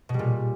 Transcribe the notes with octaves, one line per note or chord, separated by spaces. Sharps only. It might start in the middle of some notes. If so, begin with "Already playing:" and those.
B2
G3
A#2